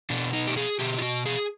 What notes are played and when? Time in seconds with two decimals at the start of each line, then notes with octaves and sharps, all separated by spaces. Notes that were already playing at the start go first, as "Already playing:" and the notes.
0.10 B2 D4
0.33 D#4
0.47 G4
0.57 G#4
0.79 B2 G4
0.99 F4
1.02 F#4
1.26 G#4